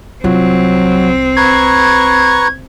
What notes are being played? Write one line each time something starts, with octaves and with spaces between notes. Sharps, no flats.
C2 F#3 C4 F4
B4 A#5 C#6 G#6